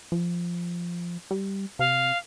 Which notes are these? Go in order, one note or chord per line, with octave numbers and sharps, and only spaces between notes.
F3
G3
C3 F5